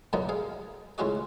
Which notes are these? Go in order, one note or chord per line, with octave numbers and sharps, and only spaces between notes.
F#2 B2 D3 F#3 A#3 D#4
G#4 F5
C#2 A2 G#3 C#4 F#4 D#5